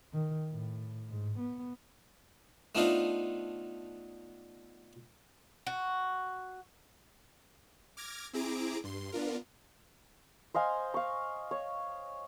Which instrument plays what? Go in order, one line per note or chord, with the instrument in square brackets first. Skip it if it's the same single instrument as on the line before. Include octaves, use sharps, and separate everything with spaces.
[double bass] D#3
A2
G#2
B3
[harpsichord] A3 B3 D4 D#4 F4 C5
[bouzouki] F#4
[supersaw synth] D6 F6 G#6 A#6
C4 E4 G#4 A#5 D6 D7
G2 C6
B3 D4 F4 A#4
[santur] C5 D#5 F5 G#5
F5 C#6
C#5